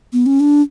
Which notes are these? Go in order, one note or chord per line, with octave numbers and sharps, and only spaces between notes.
B3
C#4
D4